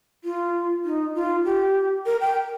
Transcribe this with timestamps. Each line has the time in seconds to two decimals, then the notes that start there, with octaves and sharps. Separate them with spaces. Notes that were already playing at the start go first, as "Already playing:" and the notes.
0.24 F4
0.85 D#4
1.15 F4
1.45 G4
2.06 A#4
2.21 G5